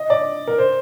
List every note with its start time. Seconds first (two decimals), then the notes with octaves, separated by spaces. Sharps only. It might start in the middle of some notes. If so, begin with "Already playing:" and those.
Already playing: D#5
0.10 D5
0.48 A#4
0.58 C5